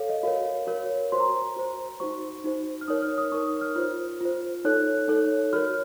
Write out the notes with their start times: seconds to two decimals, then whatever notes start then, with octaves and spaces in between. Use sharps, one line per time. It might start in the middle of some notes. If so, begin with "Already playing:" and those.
Already playing: A4 C#5 F5
0.09 D#5
0.23 F#4 A#4 C#5 F5
0.67 F#4 A#4 C#5
1.12 F#4 C5 C6
1.20 A#5
1.28 C6
1.56 F#4 C5
2.00 D#4 F#4 C5 C#6
2.44 D#4 F#4 C5
2.81 F6
2.88 D#4 A#4 C#5 D#6
3.02 F6
3.18 D#6
3.32 D#4 A#4 C#5 C#6
3.47 D#6
3.61 F6
3.76 F4 C5
4.21 F4 C5
4.65 D#4 A4 C#5 F#6
5.08 D#4 A4 C#5
5.53 F#4 A#4 C#5 F6